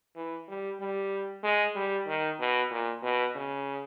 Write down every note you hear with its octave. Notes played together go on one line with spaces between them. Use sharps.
E3
G3
G3
G#3
G3
D#3
B2
A#2
B2
C#3